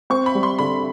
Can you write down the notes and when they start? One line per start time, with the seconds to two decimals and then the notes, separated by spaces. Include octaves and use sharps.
0.10 C4 C#6
0.26 B5
0.35 G3
0.43 C6
0.59 D3 B5